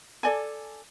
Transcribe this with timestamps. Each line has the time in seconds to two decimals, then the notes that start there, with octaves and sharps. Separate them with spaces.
0.23 A4 D5 G#5